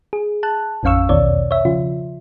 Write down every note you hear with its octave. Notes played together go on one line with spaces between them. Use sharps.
G#4
A5 F#6
A1 F2 C#4 F5 C#6 E6
B1 E2 B2 D#3 C#5 D5
C#5 E5
C#3 F3 F4